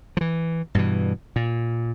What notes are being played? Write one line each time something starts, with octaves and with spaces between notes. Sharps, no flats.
E3 F3
G2 B2 E3
A#2